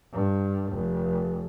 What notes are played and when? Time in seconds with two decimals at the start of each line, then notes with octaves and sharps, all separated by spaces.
0.12 G2
0.72 F1